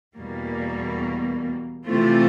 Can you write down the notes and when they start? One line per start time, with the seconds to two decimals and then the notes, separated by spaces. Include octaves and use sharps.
0.17 E2 B2 G3 A#3
1.86 C3 E3 A3 C4 F4